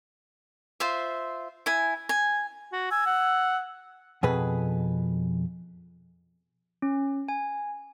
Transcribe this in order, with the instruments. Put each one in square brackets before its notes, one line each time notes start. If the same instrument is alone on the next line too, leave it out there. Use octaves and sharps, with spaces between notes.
[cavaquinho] F4 C5 E5
E4 G#5
G#5
[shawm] F#4
[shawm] G#5 [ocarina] E6
[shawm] F#5
[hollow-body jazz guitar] F2 B2 G#4 B4
[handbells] C#4
G#5